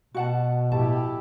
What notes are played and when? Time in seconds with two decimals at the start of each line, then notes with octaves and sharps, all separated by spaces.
0.14 B2 F#4 F#5 A5
0.72 A2 F3 E4 G4 A5